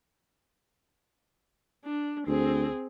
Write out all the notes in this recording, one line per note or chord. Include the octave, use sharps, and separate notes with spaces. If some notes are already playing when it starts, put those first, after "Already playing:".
D4
D2 C4 G#4